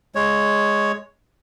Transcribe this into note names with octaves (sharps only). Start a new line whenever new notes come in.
G#3 C#5